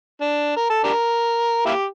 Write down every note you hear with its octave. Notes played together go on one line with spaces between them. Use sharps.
D4
A#4
A4
D4 G4 A#4
A#3 E4 G4